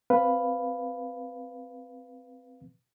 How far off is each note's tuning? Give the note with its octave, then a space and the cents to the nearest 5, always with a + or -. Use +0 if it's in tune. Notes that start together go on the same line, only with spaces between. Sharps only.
C4 -10 B4 +0 F5 +0